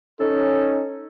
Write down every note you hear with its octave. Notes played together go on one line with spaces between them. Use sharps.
C#4 D#4 A4